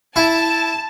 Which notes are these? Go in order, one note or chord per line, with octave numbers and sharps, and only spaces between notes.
E4 A5